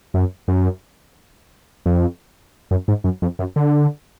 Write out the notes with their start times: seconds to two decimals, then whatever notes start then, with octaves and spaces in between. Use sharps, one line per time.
0.14 F#2
0.48 F#2
1.86 F2
2.71 F#2
2.88 G#2
3.04 F#2
3.22 F2
3.39 F#2
3.56 D3